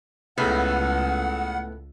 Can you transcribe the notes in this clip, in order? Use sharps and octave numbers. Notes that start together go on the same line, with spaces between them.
C#2 A2 C#3 B3 A4 F#5